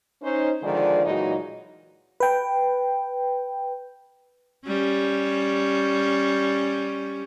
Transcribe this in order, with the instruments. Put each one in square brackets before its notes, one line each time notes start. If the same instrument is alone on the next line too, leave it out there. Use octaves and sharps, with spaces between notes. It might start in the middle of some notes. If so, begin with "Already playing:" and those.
[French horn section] C#4 D#4 C5
D3 D#3 F3 G#3 G#4 D5
A#2 E3 F#3 G#3 D#4 F#4
[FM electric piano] B4 G5
[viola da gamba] G3 C#4